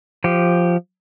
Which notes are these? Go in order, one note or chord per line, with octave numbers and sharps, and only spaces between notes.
F3 G4